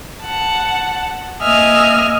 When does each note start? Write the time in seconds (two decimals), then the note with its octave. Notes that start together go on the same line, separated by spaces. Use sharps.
0.23 F#5 A5
1.42 A#3 D#5 E5 G#5 F6